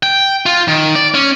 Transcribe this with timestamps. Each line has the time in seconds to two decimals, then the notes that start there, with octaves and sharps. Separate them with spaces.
0.03 G5
0.46 F4
0.68 D#3
0.95 D5
1.14 C#4